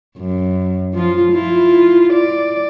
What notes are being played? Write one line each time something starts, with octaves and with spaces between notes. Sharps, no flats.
F#2
F3 F4
E4 F4
D5